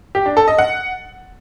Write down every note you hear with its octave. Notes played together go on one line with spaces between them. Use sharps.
G4
D4
A4
D#5
F#5